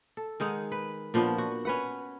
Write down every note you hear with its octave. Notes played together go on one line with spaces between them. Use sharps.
A4
D#3 G#3 D#4 F#5
B4
A#2 F3 B3 D4
F#4
C#4 B4 F#5